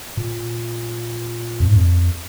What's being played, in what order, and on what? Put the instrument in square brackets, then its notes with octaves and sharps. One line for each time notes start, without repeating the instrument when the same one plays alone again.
[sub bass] A#2
F2
G#2
F2